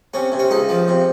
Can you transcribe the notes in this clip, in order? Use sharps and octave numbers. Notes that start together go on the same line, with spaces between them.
C3 C#4
C3
C#4
C#2 D#4
F3
C3